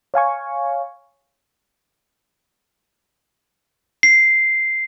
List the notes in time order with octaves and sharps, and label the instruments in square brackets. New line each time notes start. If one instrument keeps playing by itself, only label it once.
[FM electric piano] C#5 F5 G#5 C#6
[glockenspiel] C7